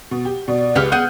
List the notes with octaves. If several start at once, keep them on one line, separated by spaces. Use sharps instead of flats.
B2
G4
B2 D5
C#2 G4 B4 F6
B3 G#4 F#5 F#6 G6 D#7